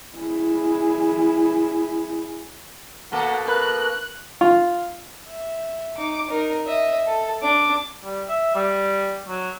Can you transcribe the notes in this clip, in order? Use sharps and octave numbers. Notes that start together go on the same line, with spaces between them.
E4 G#4
B2 A#3 A4 F#5
A#4 B4 F#6
F4
E5
D#4 D6
D#4 A#4
D#5 E5
A4
D4 D6
G3
E5
G3
F#3